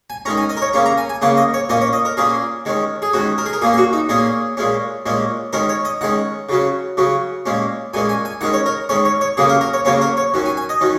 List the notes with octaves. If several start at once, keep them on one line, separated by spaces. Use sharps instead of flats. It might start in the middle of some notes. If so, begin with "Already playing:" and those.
G#5
D#3 G#3 C#4 A#5
G#5
D#5
A#4
C#5
C#3 A#3 C#4 A#5
A#5
G#5
G#5
C#3 A#3 C#4 F#5
D#5
C#5
A#2 A#3 C#4 D#5
C#5
D#5
A#4
A#2 A#3 C#4 G#4
D#3 G#3 C#4
G#4
D#3 G#3 C#4 F#4
A#4
G#4
A#4
A#2 A#3 C#4 G#4
G#4
F#4
D#4
A#2 A#3 C#4 G#4
A#2 G#3 C#4
A#2 G#3 C#4
D#3 G#3 C#4 A#4
C#5
D#5
D#3 G#3 C#4 F#5
C#3 F#3 C#4
C#3 F#3 C#4
A#2 G#3 C#4
A#2 G#3 C#4 G#5
G#5
G#5
D#3 G#3 C#4 F#5
C#5
A#4
D#3 G#3 C#4 C#5
C#5
C#5
C#3 F#3 A#3 C#4 G#4
A#4
A#4
C#5
C#3 F#3 A#3 C#4 C#5
A#4
C#5
D#3 F#3 C#4
G#5
G#5
D#5
D#3 F#3 C#4